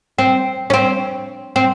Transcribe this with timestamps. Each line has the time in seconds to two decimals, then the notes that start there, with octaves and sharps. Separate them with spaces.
0.19 C4
0.70 C#4
0.74 C4
1.56 C4